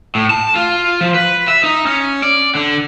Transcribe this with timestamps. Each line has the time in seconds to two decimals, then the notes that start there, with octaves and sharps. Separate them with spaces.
0.15 A2
0.30 A5
0.55 F4
1.01 F3
1.14 B4
1.48 E5
1.64 D#4
1.87 C#4
2.22 D5
2.55 D3